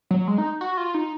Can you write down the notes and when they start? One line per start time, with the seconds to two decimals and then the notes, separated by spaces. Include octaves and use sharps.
0.11 F#3
0.28 G#3
0.38 D#4
0.61 F#4
0.77 F4
0.94 D#4